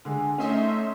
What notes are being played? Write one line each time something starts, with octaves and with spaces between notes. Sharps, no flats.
D3 G#3 G#5
A3 C#4 D#4 D#5 E5 C6